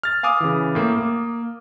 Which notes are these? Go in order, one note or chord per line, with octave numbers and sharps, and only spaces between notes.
F6 A6
F5 G#5 D6 D#6 F6
C#3 E3
A2 A#3
A#3